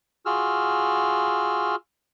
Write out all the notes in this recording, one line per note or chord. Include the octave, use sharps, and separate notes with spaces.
F4 F#4 G#4 E6 F6